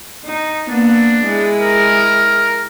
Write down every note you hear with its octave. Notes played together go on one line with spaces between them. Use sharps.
D#4
A#3 B3 D4
G#3 E4 G#4
A#4